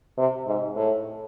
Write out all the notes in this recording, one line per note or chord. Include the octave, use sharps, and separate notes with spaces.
C3
G#2
A2